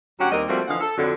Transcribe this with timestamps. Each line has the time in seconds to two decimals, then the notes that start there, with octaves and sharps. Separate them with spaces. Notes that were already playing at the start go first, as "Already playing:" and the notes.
0.19 D2 F#3 C#4 G4 F#5
0.31 D#2 G3 A#3 C4 A#4 D#5
0.48 F3 G3 A3 A#3 C4 F#4
0.68 D3 E3 F3 D#5 F5 F#5
0.80 A4
0.98 F2 D3 F#3